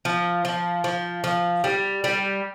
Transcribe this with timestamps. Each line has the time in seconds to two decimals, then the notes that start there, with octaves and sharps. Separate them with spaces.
0.05 F3
0.45 F3
0.84 F3
1.24 F3
1.64 G3
2.04 G3